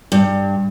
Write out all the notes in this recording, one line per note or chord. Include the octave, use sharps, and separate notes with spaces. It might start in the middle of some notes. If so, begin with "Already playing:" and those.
G2